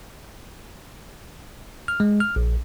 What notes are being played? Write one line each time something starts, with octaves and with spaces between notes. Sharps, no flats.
F6
G#3
F6
A#1